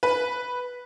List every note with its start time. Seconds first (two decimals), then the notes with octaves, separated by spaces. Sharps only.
0.03 B4